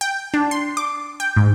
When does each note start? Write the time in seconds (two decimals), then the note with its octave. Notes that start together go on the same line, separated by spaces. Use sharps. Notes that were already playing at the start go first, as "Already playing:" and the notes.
0.01 G5
0.34 D4
0.51 C6
0.77 D6
1.20 G5
1.37 G#2